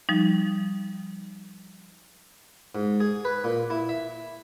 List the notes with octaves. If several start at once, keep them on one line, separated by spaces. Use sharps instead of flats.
F3 G3 D#4
G#2
G#4
B4
A#2
E4
E5